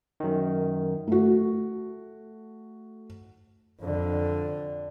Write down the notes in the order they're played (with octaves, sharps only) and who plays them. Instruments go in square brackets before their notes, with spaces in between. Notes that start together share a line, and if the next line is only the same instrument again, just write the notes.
[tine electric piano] F#2 D#3
[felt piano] A3 F#4
[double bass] F2 D3